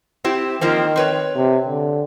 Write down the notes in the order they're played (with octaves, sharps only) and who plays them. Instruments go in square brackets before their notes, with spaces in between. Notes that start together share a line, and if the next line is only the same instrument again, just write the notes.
[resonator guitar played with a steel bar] C4 E4 G4
[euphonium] D#3 [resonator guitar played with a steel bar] F3 A#3 C4
[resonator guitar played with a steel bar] C4 B4 C#5
[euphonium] C3
D3